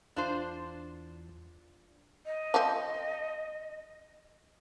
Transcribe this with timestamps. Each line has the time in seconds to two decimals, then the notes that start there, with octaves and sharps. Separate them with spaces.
0.16 E2 D4 F4 C5
2.26 D#5
2.54 F3 C4